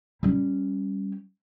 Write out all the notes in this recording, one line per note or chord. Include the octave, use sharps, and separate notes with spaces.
G3 C#4